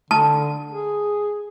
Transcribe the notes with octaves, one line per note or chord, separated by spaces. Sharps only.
D3 A5
G#4